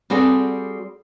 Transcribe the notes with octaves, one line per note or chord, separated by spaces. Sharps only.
G3 C4 F#4 G#4 A4 D5